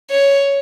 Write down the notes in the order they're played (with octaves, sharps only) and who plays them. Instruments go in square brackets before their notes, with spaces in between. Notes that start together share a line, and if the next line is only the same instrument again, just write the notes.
[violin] C#5